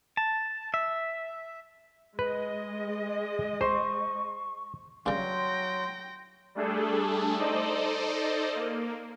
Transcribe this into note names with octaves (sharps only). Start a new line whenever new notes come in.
A5
E5
G#3 B4 D#5
C5 C6 C#6
G2 C#3 F#3 G5 C6 A#6
G3 A3 D4 G#4 A4
D#4 A4 C5 D5 D#5
A#3